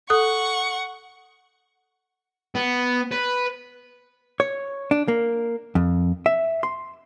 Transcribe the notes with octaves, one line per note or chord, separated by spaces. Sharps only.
A4 F#5 C#6 D#6
B3
B4
C#5
D4
A#3
F2
E5
C6